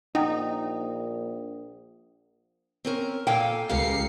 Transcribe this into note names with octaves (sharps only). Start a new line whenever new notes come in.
A#1 D#4 F#5 G5 D#6
C4 C#4 A#4
A#2 A4 F5 G5 G#5
C#2 G4 A#4 F5 C7 C#7